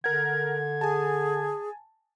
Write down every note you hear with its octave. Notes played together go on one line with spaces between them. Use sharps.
D3 A#4 F#5 G#6
G#4 G#5 A5